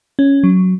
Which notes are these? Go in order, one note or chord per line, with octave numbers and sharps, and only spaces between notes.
C#4
F#3